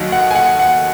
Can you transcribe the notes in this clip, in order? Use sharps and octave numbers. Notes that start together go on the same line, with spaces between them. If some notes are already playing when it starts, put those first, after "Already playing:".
Already playing: D#2 D#3 F#3 D#5
F#5
G#5
F#5
F#5